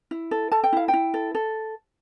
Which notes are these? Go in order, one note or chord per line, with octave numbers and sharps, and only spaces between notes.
E4
A4
A4 A5
G5
E4 F5
G5
E4
A4
A4